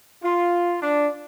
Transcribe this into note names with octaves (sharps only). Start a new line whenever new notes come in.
F4
D4